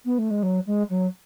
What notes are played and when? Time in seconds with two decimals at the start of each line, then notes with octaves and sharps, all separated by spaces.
0.05 B3
0.18 A3
0.30 G#3
0.43 F#3
0.67 G#3
0.90 F#3